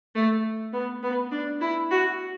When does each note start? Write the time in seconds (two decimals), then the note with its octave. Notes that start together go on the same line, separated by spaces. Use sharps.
0.15 A3
0.73 B3
1.03 B3
1.31 D4
1.61 E4
1.91 F#4